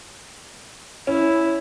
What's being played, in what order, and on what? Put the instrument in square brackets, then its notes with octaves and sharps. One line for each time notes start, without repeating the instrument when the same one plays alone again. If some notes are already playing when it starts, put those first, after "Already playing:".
[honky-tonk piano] C#4 [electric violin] E4